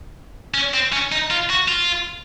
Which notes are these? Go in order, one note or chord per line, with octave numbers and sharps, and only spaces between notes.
C#4
C4
C#4
D#4
F4
F#4
F4